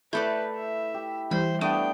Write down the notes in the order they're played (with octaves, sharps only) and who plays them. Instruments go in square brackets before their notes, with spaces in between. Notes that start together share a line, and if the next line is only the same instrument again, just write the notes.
[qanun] A3 A4 D5 [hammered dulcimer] E4 [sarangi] B4 [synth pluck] G6
[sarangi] E5
[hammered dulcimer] G4
[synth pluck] E3 G3 [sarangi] C5 [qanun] B5
[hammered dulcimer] A3 B3 F5 [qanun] D4 [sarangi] G5 [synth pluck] D#6